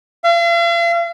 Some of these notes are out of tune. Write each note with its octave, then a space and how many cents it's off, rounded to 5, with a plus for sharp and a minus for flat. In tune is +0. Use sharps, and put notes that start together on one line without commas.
F5 -45